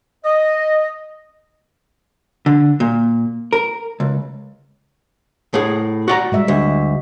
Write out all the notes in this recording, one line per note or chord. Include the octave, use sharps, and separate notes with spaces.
D#5
D3
A#2
A#4
C#2
A2 G#4
F#4 D5 A#5
G3 G#3 E5
D2